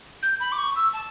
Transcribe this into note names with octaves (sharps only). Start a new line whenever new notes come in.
G6
B5
D6
C#6
E6
A5